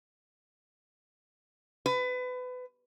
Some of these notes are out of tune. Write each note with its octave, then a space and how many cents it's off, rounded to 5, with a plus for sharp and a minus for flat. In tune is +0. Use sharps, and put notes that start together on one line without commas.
B4 +25